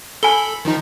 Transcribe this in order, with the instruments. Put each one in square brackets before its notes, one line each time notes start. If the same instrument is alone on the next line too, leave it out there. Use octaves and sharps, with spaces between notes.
[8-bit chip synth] A4 B5 [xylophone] G#5 G7
[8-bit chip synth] D#3 F3 D#4